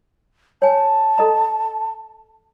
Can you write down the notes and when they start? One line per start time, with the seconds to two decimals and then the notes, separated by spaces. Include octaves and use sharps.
0.62 C#5 G#5 A5
1.18 A4 D#5 A#5